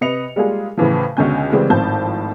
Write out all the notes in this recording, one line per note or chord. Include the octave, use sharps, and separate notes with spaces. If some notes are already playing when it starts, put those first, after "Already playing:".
C3 B4 D#5 C#7 F7
G3 G#3 A#3 F4 G#4
A2 C#3 E3 F3
C#2 B2 D3 C#4 G#5 G6
C#3 E3 G3 G#3 C4 C#4
G#1 A2 F3 C4 A5 G6